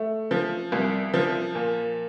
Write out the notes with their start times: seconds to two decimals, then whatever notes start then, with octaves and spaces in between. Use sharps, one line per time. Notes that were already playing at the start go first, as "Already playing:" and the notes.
Already playing: A3
0.31 F3
0.72 C2
1.14 F3
1.55 A#2